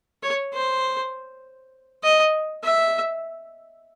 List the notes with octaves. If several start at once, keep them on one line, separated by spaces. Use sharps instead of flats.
C#5
C5
D#5
E5